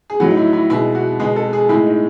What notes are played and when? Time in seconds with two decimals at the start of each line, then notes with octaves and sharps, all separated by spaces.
0.10 G#4
0.20 A2 F#3 F#4
0.31 D#4
0.37 E4
0.53 E4
0.70 B2 G#3 E4
0.95 F#4
1.20 B2 G#3 G#4
1.36 A4
1.53 G#4
1.69 A2 G#3 E4
1.86 D#4